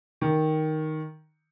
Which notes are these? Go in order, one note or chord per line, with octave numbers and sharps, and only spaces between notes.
D#3